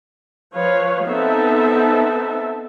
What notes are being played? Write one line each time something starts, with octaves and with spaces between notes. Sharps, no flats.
F3 B4 C#5 F5
B3 C4 D#4 A4 E5 A5